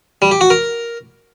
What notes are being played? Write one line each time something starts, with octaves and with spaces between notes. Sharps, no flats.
G3
G4
F#4
A#4